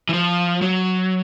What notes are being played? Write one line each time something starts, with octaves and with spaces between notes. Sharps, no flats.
E3
F3
F#3